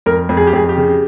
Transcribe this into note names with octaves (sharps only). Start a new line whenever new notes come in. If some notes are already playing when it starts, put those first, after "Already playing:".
F2 A#4
F2
G#4
G4
F2 G#4
G4
C#3